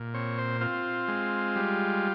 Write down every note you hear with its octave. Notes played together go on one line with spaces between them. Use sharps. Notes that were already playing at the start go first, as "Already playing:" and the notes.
Already playing: A#2
C4 C#5
C5
C4 F4
G#3
G3